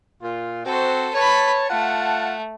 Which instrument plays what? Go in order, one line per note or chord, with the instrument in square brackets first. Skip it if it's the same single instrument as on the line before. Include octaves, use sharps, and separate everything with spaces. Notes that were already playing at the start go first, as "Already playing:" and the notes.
[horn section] A#2 F4
[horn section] C4 F#4 [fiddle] A4 C5
[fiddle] B4 B5 [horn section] C#5 A5
[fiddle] A3 [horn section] F4 F#5 A5